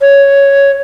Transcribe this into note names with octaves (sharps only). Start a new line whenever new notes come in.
C#5